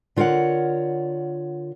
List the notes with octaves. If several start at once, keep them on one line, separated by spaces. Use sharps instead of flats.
D3 F4 A#4 C#5 F#5